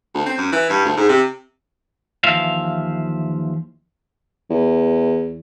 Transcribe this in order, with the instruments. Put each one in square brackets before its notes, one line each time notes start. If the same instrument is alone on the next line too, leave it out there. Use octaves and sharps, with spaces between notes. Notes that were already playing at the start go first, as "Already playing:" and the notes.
[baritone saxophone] D2
C4
F#2
E3
G2
D2
G#2
C3
[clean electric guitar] D#2 E3 F3 E5 F5
[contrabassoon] E2